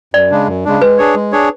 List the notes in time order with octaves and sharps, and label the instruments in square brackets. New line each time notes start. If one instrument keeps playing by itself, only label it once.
[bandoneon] F#2 [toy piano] D5
[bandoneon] C#3 G#3 D4
F#2
C#3 G#3 D4
[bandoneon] G#3 [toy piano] B4
[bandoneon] D4 G#4 C#5
G#3
D4 G#4 C#5